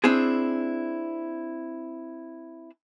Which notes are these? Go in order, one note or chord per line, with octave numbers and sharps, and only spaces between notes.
C4 D4 E4 G#4